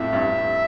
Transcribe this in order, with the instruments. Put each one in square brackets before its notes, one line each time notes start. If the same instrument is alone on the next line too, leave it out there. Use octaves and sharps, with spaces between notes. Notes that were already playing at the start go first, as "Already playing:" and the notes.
Already playing: [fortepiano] F2 A2 [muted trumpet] E5
[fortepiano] G2
F2
G2